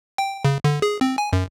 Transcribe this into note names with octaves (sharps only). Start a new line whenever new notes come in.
G5
C#3
D3
G#4
C4
G#5
F#2